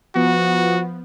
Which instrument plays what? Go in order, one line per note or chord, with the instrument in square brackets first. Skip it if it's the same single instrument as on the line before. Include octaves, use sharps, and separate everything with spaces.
[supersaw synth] F3 B3 [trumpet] F#4